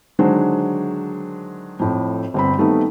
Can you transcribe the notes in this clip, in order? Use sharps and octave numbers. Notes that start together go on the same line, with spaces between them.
D3 D#3 F#3 G#3 D4 C5
F2 A2
G1 C4 B5
D#3 G3 A3 B3 C4 D#4